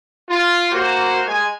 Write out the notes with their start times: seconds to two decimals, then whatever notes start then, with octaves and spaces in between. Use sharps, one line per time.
0.30 F4
0.72 A#3 F#4 C5
1.27 G#3 G#5